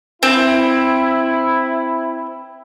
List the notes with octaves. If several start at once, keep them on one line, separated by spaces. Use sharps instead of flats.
C4 E4